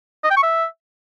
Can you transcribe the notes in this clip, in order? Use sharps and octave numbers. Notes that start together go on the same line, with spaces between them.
D#5
G5
C#6
E5